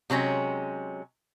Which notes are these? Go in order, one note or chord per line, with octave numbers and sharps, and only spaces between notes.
C3 F#3 G#3 C#4